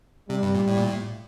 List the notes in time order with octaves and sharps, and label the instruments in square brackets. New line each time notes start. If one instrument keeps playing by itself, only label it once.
[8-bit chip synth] C3 [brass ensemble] G3
[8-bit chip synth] G2
A#2
A2
A#2
A2